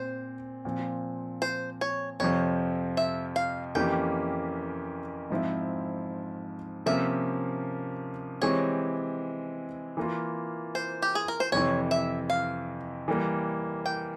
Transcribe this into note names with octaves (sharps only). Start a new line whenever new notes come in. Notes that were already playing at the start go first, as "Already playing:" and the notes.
Already playing: A#2 C4 C5
A#2 F3 C4
C5
C#5
F2 C3 F3 C#5
E5
F5
F2 E3 A#3 C#4 G4 G5
G#2 F3 C4 E4
C3 F3 A#3 C#4 E5
E3 G#3 C4 G4 C#5
E3 A#3 F4
C5
G4
G#4
A#4
C5
F2 C3 E3 C#5
E5
F5
E3 G3 A#3
G5